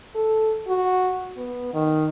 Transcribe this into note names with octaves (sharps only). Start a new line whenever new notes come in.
A4
F#4
B3
D#3